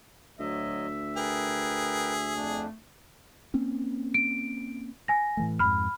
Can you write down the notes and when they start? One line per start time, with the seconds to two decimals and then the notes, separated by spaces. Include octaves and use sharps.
0.39 D2 F#3 D#5 E5
1.16 G#4 A#4 B4 G5
2.36 F2 A3 D4
3.54 A#3 C4 C#4
4.14 D7
5.08 G#5 A#6
5.37 A2 E3 A3
5.59 F2 G#2 B5 F6